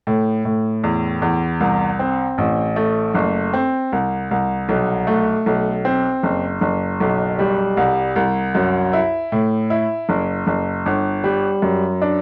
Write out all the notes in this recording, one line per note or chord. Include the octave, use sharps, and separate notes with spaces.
A2
A2
E2
E2
C2
C4
A1
A3
F#1
C4
C2
C2
B1
A3
B1
C4
F#1
F#1
B1
G3
C2
C2
F#2
E4
A2
E4
F#1
F#1
G1
G3
F#2
D4